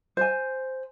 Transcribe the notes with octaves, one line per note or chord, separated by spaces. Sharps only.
C5 G#5